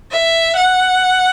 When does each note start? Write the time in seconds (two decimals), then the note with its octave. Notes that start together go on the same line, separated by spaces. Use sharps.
0.13 E5
0.57 F#5